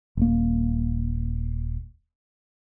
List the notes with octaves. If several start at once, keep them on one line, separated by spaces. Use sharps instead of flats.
D#1 A#3